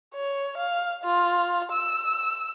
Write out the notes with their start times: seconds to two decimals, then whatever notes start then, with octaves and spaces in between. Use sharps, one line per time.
0.15 C#5
0.57 F5
1.04 F4
1.72 E6